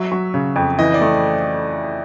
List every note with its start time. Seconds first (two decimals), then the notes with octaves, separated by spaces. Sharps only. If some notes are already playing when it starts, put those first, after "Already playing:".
Already playing: F#3 E5
0.12 F#3
0.34 C#3
0.56 F2
0.79 E3 D#5
0.94 D5
1.01 A3